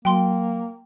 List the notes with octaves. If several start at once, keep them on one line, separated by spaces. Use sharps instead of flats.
F#3 A#3 G5 C6